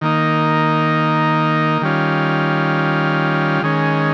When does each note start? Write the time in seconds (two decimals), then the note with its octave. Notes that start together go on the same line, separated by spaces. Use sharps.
0.01 D#3 A#3 D#4
1.82 D#3 G3 C#4 F4
3.63 D#3 G#3 C#4